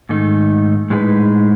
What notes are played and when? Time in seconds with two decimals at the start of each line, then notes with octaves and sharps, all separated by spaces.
0.09 G#2 D#3 A3 D#4
0.90 A2 G#3 D#4 G#4 B4